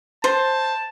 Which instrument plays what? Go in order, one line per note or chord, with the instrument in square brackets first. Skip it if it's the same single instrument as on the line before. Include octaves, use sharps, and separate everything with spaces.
[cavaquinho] C5 [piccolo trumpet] A5